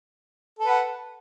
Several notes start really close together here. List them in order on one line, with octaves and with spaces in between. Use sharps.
A4 B4 F#5